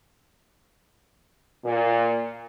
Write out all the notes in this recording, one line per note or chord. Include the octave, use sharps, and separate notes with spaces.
A#2